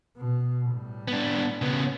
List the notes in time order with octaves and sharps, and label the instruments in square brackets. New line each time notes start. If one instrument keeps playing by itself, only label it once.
[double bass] B2
A2 G3
[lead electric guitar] B3 D4
C#3 B3